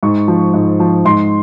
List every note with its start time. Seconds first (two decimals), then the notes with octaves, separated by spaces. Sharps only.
0.03 G#2 C#6
0.28 F3
0.54 G#2
0.80 F3
1.05 G#2 C6